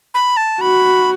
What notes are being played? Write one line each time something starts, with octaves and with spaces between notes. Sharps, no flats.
B5
A5
F#4 B5